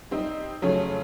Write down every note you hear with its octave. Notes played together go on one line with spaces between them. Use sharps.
G3 C4 D#4
F2 C#3 F#3 A3 C#4